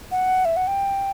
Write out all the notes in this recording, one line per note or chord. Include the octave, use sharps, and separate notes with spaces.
F#5
E5
F#5
G5